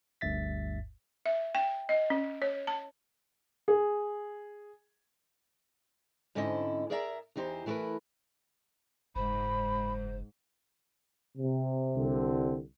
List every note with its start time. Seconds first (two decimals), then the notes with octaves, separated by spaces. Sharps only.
0.21 G1 D2 G2 E5 A6 B6
1.26 E5
1.55 G5
1.89 D#5
2.10 C#4
2.42 C#5
2.67 A5
3.68 G#4
6.35 G#2 D3 C4 C#4 E4 D#5
6.90 G#4 A#4 D5 E5 F#5 A#5
7.36 E2 E3 D#4 G4 C5
7.66 E3 A3 E4 G4 A#4 B4
9.16 F#1 G#2 C5 B5
11.36 C3
11.94 C2 D3 C4